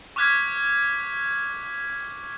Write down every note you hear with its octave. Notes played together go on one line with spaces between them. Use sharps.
C#6 D6 F6 F#6 G#6 B6